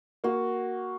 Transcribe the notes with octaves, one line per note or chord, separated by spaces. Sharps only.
A#3 F#4